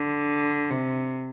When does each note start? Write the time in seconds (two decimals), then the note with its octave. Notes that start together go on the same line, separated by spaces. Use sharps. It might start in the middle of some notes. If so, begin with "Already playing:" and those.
Already playing: D3
0.70 C3